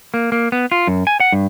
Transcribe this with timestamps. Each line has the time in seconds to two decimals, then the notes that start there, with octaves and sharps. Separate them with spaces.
0.14 A#3
0.32 A#3
0.52 B3
0.72 F4
0.87 F#2
1.07 G#5
1.20 F#5
1.32 G2